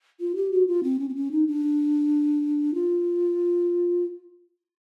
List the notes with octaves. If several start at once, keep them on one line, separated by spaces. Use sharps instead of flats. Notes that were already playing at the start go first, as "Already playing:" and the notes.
F4
G4
F#4
F4
C4
C#4
C4
C#4
D#4
D4
F4